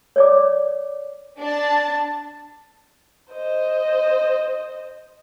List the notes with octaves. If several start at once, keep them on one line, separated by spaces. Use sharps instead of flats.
C#5 D5 D6
D4 A5
C5 D#5